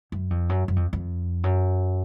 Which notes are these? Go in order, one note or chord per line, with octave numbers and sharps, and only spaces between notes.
F#2
F2
F#2
F#2
F2
F2
F#2